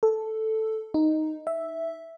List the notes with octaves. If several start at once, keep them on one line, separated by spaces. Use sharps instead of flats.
A4
D#4
E5